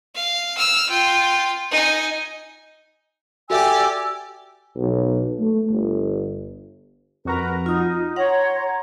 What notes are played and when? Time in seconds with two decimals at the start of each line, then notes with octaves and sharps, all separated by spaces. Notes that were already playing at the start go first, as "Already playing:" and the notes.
0.15 F5
0.57 E6 F6
0.89 F4 G5
1.71 D#4 G#5
3.50 F#4 G4 A4 D5 E5 G#5 E6
4.76 B1
5.40 A3
5.71 G1
7.25 F2 F#4 A#4 B4 A#5
7.66 D#4 F4 D#6
8.16 C#5 F#5 A#5 C6